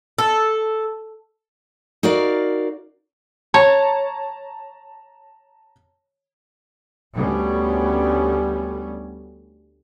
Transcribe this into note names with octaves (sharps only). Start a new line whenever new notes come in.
A4
D#4 F#4 A#4 D5 F5
C#5 A5 A#5
D2 D3 G3 B3 C#4